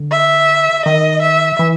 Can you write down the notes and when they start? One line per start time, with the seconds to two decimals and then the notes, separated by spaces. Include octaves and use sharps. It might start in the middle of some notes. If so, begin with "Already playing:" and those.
Already playing: D3
0.11 E5
0.85 D#3 D#5
1.22 E5
1.59 E3